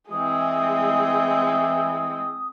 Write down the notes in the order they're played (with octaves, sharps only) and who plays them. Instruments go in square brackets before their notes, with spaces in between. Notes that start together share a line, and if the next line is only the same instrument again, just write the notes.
[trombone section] E3 [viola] G#3 C4 [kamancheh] G#4 D#5 [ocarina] D#6